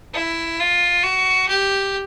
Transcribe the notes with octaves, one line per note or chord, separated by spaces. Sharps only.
E4
F4
F#4
G4